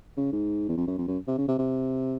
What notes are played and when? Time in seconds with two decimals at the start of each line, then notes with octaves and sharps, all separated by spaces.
0.17 C#3
0.32 G#2
0.69 E2
0.77 F2
0.87 F#2
0.98 F2
1.07 F#2
1.28 C3
1.38 C#3
1.48 C3
1.58 C3